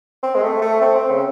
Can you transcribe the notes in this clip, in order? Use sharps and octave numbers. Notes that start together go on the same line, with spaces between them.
C4
G#3
A3
A3
C4
C4
C#3